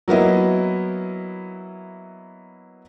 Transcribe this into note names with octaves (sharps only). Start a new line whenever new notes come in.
F#3 A#3 B3 E4 D#5